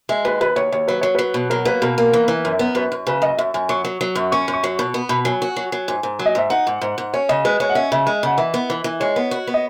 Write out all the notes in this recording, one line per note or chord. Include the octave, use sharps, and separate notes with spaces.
G#3 E5
D#2 B4
D#2 B4
D#2 C#5
D#2 C#5
F#3 B4
F#3 C#5
F#3 B4
B2
F#3 A#4
A#3 B4
B2 A#4
A#3
E3
E3
F#2
B3
F#2 B4
F#2
C#3 B4
F#2 D#5
F#2 E5
F#2 G#5
F#3 C#6
F#3
F#3
F#2
C#4 C#6
F#2
C#6
F#3
B2
B3
B2 B5
F#3 G#5
F#4
F#3
F#3
G#2 G#5
G#2
F#3
D#5
G#2 E5
D#4 F#5
G#2
G#2
G#2
C#4 C#5
C#3 D#5
G#3 B4
G#3 C#5
F#5
C#4 E5
C#3 E5
G#3
C#3 F#5
E3 E5
B3
E3
E3
G#3 C#5
B3
F#4
B3
D#5